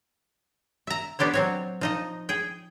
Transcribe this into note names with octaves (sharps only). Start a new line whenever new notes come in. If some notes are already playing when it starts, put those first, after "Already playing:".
E5 A#5
B3 D4 G4 C5 C#5
F#3 C4 C#5
F3 D#4 D#5
G#4 G5